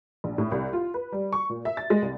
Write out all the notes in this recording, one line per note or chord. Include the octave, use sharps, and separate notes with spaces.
A#1
A2
C2
F4
B4
G3
C#6
A#2
E5
A6
G#3
C2